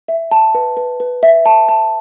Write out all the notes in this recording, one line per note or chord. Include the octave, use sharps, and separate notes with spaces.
E5
A5
B4
B4
B4
E5
A5
A5